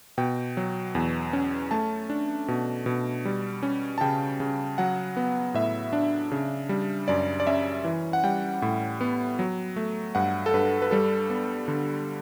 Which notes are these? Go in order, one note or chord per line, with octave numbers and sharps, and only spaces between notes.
B2 G5
F#3
E2
C#4
A3 A5
D4
B2
B2
G3
C#4
A5
C#3 G5
C#3
F#3 F#5
B3
A2 E5
D4
C#3
G3
F#2 D5
D5
C#4 E5
E3
F#5
G3 G5
A2
B3
F#3
A3
G2 F#5
A4
G2 B4
B4
G3 A4
B3
D3